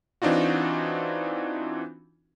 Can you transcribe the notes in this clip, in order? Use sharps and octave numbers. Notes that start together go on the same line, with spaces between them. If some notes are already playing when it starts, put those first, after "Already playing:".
E3 C4 D4 D#4 F4 F#4